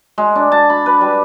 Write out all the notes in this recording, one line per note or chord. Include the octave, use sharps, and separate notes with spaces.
G#3
D4
A5
B5
B4
G3